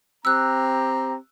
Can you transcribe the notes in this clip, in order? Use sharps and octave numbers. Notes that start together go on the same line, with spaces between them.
C4 G4 A#5 E6 F#6